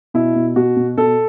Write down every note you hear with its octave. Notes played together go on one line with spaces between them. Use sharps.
B2 E4
B2
B2 F#4
B2
B2 A4